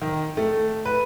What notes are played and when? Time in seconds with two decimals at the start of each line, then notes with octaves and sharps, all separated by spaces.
0.02 D#3
0.37 A3
0.85 B4